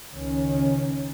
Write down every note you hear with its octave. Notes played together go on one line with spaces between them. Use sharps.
C#2 D#3 C#4